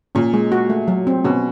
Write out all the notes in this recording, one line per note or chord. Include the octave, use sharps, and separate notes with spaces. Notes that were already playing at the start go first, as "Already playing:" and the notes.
A#2 C#4
G#3
F#4
A3
F#3
C4
B2 C#4